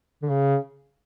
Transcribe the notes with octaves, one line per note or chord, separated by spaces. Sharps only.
D3
C#3